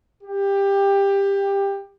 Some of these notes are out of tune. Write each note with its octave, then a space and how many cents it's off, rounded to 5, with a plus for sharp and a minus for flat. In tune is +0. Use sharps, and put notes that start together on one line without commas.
G4 +15